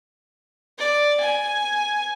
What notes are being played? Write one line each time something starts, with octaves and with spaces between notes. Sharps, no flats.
D5
G#5